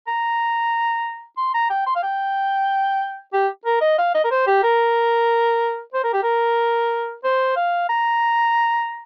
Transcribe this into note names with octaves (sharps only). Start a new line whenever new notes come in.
A#5
C6
A#5
G5
C6
F5
G5
G4
A#4
D#5
F5
D#5
A#4
C5
G4
A#4
C5
A#4
G4
A#4
C5
F5
A#5